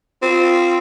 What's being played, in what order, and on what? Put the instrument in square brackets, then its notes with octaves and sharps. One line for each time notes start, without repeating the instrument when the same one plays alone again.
[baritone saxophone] C4 [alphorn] F4